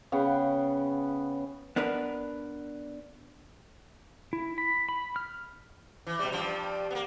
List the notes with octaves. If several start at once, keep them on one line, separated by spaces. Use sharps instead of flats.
C#3 B3 F#5 G5
B3 D4 A#4 B4
E4
B5
B5
F6
E3
B2 G3
G2 F3 G3
A#3 B3